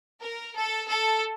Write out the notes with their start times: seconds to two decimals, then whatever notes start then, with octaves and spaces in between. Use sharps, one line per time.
0.21 A#4
0.55 A4
0.89 A4